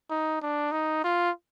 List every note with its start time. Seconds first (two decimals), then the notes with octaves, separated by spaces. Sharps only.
0.10 D#4
0.42 D4
0.72 D#4
1.04 F4